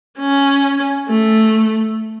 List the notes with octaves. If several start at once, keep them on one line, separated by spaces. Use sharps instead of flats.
C#4
A3